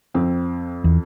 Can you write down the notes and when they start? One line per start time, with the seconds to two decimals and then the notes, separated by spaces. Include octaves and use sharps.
0.14 F2 C4
0.84 E2